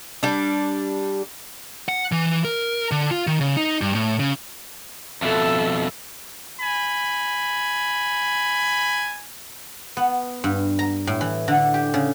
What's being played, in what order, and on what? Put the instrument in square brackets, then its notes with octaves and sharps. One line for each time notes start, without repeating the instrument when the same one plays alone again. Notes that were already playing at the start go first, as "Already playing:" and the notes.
[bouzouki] G3 D4
[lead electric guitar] F#5
E3
A#4
D3
F4
D#3
C#3
D#4
G2
A2
C#3
[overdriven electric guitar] F2 B2 [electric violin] A4 E5
[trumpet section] G#5 B5
[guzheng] B3
G2
A#5
A2
E3
D3
G4
C#3